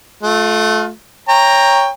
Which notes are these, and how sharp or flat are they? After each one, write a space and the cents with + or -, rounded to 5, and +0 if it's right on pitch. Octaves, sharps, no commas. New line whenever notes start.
A3 -20 F4 +25
C#5 +0 G5 +20 A#5 +0